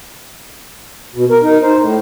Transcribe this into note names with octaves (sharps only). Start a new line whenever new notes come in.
B2
A#4
D#4
C5
A2